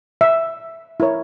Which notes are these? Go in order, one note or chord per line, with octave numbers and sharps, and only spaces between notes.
E5
E4 A#4 C#5